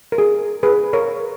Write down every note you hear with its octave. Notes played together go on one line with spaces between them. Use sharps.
A#4
G#4
G#4 B4
A#4 C#5